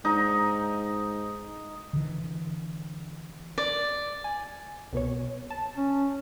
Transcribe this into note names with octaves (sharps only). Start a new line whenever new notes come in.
G#2 D#4
D3 E3
D5
G#5
C2 B2 C#5
A5
C#4